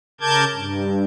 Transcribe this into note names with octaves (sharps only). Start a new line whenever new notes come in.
C#3 A#4 A5 D6 G6 G#6
G2